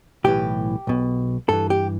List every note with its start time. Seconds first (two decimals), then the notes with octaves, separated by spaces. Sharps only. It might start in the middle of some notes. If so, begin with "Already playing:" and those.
0.24 B1 A2 E3 G4
0.87 B1 B2
1.49 G2 E3 A4
1.70 G4